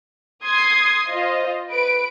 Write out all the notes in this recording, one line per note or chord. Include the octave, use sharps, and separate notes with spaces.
C6 D#6 G#6 C7
F4 C5 D#5
B4 D7